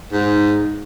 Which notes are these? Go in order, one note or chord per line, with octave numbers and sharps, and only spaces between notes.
G#2